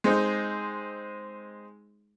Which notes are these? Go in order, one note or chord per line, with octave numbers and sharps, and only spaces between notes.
G#3 C4 D#4